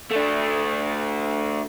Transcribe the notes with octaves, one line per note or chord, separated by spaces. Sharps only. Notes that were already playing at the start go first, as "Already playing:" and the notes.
A3 D4